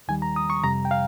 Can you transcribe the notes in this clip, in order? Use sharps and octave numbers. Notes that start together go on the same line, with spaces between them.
D#2 D#3 G3 G#5
A#5
D#6
C#6
F2 C3 G3 A#5
G5
F5